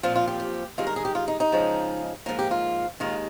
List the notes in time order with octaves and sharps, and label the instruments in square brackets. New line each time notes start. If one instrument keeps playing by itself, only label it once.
[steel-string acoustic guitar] A#2 F3 C4 F4
F4
G4
G4
G2 D#3 G#3 F4
A#4
G#4
G4
F4
D#4
D#4
C#3 F3 G#3
G#2 F3 A#3 F4
G4
F4
D#2 D#3 G#3 F4